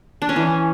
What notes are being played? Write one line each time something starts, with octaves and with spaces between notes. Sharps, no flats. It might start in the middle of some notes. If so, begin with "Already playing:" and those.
D4
C#4
E3